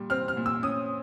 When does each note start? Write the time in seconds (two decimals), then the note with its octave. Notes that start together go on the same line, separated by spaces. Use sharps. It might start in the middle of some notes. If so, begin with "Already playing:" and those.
Already playing: A#2 G3
0.10 C4 F6
0.28 F6
0.37 A#2
0.46 E6
0.63 C#4 D#6